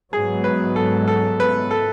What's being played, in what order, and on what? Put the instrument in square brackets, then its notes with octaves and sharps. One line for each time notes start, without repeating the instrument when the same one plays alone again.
[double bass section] G#2 F#3 B3 [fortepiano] G#4
[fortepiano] B4
A4
A4
B4
A4